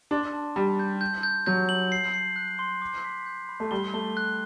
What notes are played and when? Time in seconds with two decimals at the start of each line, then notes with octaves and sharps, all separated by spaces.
0.11 D4 C6
0.33 A5
0.56 G3 A5
0.79 G6
1.01 G6
1.23 G6
1.46 F#3 G6
1.69 F#7
1.92 C7
2.14 C7
2.36 F#6
2.59 C6
2.82 D6
3.04 B6
3.26 G6
3.49 B5
3.60 A3
3.71 G3 G7
3.94 A3 G7
4.17 F#6